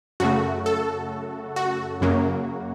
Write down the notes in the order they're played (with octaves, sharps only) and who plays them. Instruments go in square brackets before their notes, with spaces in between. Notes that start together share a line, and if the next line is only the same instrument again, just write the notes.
[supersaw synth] F#2 C#3 A3 F#4
A4
F#4
F#2 C#3 F#3 A#3